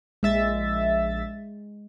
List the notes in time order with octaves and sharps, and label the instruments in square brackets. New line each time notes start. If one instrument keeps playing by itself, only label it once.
[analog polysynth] A#1 E5 A6 [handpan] G#3